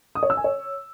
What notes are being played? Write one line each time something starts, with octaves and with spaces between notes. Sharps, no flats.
D#6
C#5
E6
G#5
C#5